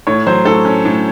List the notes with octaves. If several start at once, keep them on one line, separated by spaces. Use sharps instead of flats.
A2 C#5
F#3 C5
A2 A4
C#4
A2